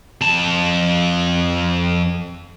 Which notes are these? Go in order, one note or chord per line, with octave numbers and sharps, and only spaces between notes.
F2 A5